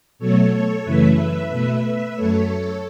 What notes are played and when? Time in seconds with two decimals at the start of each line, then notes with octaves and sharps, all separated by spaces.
0.19 B2 F#3 A3 A4 C#5
0.52 A4 C#5
0.84 F#2 C#3 E3 A3 B4 E5
1.17 B4 E5
1.50 B2 A3 B4 E5
1.83 B4 E5
2.15 F#2 F#3 A3 A4 C#5